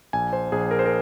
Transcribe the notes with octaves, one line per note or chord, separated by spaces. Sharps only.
A#1 G#5
C5
A#1 G#4
A#4
C5
A#4